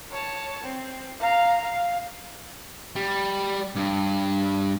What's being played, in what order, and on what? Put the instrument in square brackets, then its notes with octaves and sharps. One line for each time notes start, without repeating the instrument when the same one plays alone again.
[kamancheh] C#5 A5
C4
F5 A#5
F5
[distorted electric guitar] G3
G2